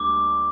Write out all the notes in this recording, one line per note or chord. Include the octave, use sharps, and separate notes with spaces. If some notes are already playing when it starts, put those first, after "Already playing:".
Already playing: D2 D3 G3 A#3 D4 D6